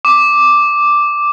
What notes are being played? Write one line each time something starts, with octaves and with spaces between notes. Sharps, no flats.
D6